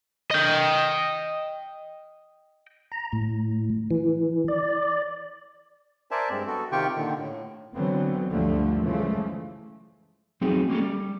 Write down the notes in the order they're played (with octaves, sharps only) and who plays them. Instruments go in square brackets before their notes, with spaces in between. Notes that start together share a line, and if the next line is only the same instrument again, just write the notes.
[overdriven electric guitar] D#5 G5
[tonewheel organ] A#5
A2
E3
D5
[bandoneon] A#4 C5 D5 E5 G#5 A5
G2 G#3 C4
B3 F#4 A4
C3 D#3 F4 G4 G5 C#6
A#2 D3 D#3
A2
[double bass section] D3 E3 F#3 B3 C4
D2 G2 D3 F3 G3 A3
F#2 C#3 E3 F3 G#3 A3
[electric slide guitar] F2 F#3 A3 C4 D#4 G#4
A#3 C#4 G#4 A4
G3